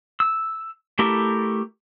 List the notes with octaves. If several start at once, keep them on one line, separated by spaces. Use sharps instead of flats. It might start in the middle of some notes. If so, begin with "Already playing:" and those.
E6
A3 E4 G4 A4 A#4